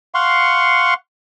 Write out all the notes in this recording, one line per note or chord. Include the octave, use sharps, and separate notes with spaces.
F5 F#5 C6 C#6